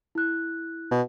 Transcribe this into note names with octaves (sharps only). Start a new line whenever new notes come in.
E4 F#6
B2